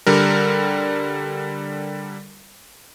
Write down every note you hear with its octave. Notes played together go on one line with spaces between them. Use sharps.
D3 G3 A#4